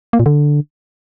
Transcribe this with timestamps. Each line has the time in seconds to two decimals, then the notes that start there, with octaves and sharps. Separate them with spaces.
0.13 A#3
0.19 A#2
0.26 D3